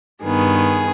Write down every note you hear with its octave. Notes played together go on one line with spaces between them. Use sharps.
G2 D#3 B3 G#4